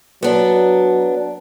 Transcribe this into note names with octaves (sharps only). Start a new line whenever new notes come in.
F#3 B3 D4